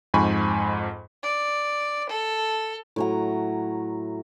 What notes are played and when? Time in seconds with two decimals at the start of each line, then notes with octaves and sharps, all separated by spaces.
0.14 F2 G#2 G#5 B5 C#6
1.23 D5
2.09 A4
2.96 A2 F#3 A#5